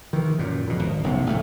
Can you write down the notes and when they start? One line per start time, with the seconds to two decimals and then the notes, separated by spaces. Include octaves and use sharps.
0.13 D#3 E3
0.39 F#2 A#2
0.67 F2 B2
0.79 G#1
1.03 F1 B1 E2 C3
1.27 A1 A2 C#3 A3